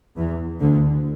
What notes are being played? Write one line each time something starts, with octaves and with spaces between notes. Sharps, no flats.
E2 E3
D2 D3